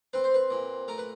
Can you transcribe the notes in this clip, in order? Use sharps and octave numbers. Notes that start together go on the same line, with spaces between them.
C4 B4
C5
B4
A#2
A3 A#4
B4